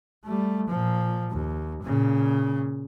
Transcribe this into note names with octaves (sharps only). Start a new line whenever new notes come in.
G3 A3
A#2 F3
D#2
A#2 C#3